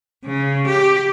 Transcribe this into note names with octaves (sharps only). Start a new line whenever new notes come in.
C#3
G4